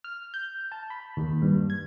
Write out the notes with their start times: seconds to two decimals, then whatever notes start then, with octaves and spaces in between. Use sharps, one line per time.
0.04 F6
0.34 G6
0.72 A5
0.90 B5
1.17 D#2
1.42 G2
1.70 G#6